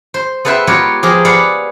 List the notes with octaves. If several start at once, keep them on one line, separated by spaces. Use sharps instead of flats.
C5
B3 A4 B4 C5 E5 G5
B3 F4 G4 A#4 B4 C#5
F3 G4 G#4 A#4
B4 D5 F5 F#5 B5